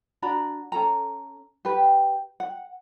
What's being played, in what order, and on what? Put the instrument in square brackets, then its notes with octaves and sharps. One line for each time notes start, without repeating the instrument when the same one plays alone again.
[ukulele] D4 F#4 A#5 B5
C#4 A4 A#5
G4 B4
F#5